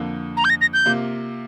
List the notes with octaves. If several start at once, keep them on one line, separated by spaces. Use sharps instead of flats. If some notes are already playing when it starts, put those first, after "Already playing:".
Already playing: F2 D3 A#3
A#5
G6
A#6
A#6
G6
C3 A#3 F4